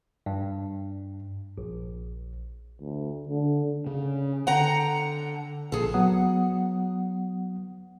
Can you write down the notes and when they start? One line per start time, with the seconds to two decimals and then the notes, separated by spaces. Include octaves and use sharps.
0.26 G2
1.58 A#1
2.81 D2
3.29 D3
3.87 C#3
4.47 D3 F#5 G5 A#5
5.72 A#1 G#4 A4
5.94 F#3 B3 F#5 D#6